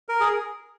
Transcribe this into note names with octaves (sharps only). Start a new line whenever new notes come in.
A#4
G#4